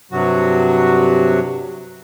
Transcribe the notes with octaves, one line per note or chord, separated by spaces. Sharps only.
G2 C3 F#3 F#4